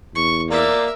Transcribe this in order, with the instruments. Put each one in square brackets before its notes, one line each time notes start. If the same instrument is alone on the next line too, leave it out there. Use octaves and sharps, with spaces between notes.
[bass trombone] E2 [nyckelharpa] C#6
[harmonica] A#3 D5 [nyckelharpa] A#4 E5